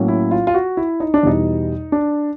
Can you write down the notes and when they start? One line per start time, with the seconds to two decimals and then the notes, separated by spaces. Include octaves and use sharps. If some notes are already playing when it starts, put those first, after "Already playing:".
Already playing: A2 F#3 A#3 C#4
0.08 E4
0.31 F4
0.47 F4
0.54 F#4
0.77 E4
1.00 D#4
1.14 D4
1.23 E2 B2 G3 D#4
1.92 D4